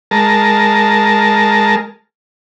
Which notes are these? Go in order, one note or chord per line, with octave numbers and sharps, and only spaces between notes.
G#3 A#4 A5